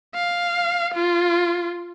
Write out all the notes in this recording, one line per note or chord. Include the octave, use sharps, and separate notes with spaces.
F5
F4